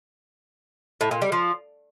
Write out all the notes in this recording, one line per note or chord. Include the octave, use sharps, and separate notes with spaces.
A2
A#2
G3
F3